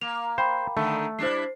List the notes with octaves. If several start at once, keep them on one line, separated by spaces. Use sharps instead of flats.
A#3 F7
C5 F5 G5 B5
D3 D#3 A3
G3 D4 E4 C5 C7